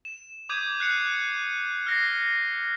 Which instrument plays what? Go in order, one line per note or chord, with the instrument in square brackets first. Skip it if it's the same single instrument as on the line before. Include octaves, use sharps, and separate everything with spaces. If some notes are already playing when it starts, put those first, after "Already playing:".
[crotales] E7
D6 D#6 G6 G#6 D#7
F#6 C7 C#7 D#7 F7
D#7
F6 A#6 C7